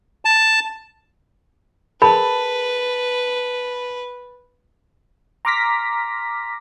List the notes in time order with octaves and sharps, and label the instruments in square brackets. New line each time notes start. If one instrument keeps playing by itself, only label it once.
[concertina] A5
[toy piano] G#4 A#4 B5 [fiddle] B4 [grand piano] A5
[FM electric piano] A#5 C6 D6 F6 A#6 B6